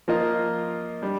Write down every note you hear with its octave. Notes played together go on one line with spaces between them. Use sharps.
F3 A#3 F4 A#4 D#5
G3 D4